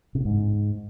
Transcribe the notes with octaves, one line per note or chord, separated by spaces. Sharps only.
C3
B2
G#2